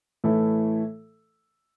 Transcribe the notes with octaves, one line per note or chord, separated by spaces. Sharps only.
A2 E3 A3 E4 A4